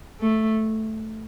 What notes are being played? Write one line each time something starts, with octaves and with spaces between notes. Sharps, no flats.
A3